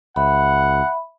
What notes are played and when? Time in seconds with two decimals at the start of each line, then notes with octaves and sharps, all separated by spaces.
0.16 C#2 E5 F#5 B5